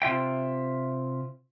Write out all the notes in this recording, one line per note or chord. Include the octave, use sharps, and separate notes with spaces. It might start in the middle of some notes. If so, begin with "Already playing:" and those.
C3 F4 E5 G5